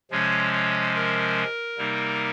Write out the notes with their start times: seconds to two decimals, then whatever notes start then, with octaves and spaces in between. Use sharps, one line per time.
0.11 C3 F3 G#3 C#4 C#5
0.53 C#5
0.95 A#4
1.78 C3 G3 A#3 D#4